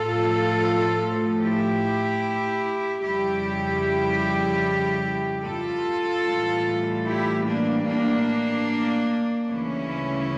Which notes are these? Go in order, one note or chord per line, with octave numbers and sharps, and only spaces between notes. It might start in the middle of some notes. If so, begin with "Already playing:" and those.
Already playing: A2 F3 A3 F4 A4
E4 G4
F2 C#3 G3 E4 G4
F4 A4
A2 E3 G3
E4 G4
A#3 D4
A#3 D4
D2 C#3 E3 G3 C#4 E4